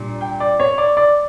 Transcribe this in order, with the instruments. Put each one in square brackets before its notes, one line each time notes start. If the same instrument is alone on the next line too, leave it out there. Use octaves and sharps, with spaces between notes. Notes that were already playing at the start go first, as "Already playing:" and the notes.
Already playing: [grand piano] A#2 G3 D4
G5
D5
C#5
D5
D5